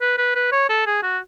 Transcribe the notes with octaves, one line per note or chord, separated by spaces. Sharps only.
B4
B4
B4
C#5
A4
G#4
F#4